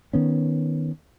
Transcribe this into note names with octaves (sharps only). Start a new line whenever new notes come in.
D#3 B3 C#4